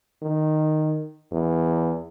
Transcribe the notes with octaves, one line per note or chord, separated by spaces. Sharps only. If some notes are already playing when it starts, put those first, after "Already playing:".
D#3
E2